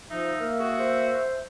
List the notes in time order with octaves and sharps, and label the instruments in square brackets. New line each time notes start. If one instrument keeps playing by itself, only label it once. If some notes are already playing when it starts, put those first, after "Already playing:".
[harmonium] F3 [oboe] D#4 [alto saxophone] E5
[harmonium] A#3 [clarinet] A#4
[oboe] F#4 [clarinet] G#4
[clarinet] C5